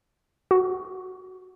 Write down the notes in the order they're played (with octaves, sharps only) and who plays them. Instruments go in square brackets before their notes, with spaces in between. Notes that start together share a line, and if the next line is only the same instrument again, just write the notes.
[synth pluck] F#4